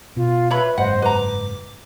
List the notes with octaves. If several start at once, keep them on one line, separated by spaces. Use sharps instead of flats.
B2 F4
B4 C#5 E5 B5
F#1 G#2 C5 D#5 F#5
B4 A#5 D6